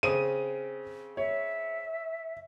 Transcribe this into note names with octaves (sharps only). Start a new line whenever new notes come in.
C#3 C4 D#6 D#7
C#5 E5